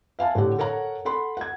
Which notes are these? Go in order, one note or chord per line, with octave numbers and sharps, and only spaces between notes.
E5 F5 G#5 A5
A2 D3 G4 F#5
A4 A#4 C#5 F#5 A#5
A4 F#5 B5 C6
F#5 G#6